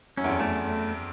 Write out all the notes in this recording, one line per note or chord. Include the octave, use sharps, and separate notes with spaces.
F#2 C#4
E2
F2
E2 A3